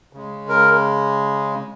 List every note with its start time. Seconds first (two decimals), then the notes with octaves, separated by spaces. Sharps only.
0.13 C#3 G#3
0.49 A#4